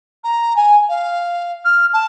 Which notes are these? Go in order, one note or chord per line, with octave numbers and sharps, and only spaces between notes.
A#5
G#5
F5
F6
A5